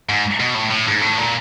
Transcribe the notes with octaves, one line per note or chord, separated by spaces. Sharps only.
G#2
B2
A2
A2
G#2
A2
A#2